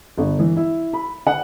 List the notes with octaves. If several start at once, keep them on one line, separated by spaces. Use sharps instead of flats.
G1
E3
E4
B5
F#5